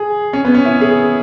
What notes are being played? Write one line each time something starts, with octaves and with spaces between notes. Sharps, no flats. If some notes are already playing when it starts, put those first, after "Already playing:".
Already playing: G#4
C#4
B3
C#4
E4
G#4